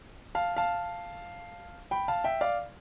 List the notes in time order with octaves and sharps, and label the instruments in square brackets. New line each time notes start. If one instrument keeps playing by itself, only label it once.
[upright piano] F5 A5
F5 A5
G5 B5
F5 A5
E5 G5
D5 F5